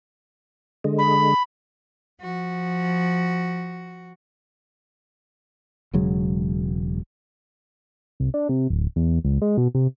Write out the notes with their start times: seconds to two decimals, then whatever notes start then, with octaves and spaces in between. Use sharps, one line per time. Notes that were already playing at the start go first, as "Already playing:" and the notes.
0.84 D3 G#3
0.98 B5
2.21 F3 F#4
5.93 E1 C#3 F#3 G#3
8.20 C2
8.34 D4
8.49 C3
8.70 D1
8.96 E2
9.25 C#2
9.42 G#3
9.57 B2
9.75 C3